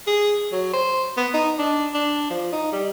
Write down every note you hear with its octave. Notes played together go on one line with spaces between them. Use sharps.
G#4
F#3
C5
B3
D#4
D4
D4
F3
D#4
G3